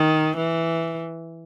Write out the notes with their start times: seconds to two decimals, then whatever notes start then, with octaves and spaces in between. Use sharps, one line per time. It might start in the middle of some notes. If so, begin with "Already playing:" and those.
Already playing: D#3
0.37 E3